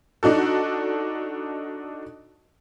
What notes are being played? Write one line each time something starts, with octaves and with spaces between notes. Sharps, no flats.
D4 D#4 F#4 A4